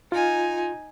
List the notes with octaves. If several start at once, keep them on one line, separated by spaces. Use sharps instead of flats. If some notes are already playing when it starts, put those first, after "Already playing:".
D#4 F4 G#5